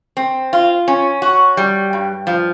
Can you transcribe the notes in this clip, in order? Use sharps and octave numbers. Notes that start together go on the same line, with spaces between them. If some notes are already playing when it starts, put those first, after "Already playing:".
C4
F4
C#4
F#4
G3
G2
F3